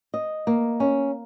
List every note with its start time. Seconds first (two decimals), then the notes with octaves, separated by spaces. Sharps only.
0.14 D#5
0.47 A#3
0.80 C#4